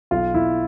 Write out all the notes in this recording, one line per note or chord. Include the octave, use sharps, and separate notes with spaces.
B1 F4
B1 E4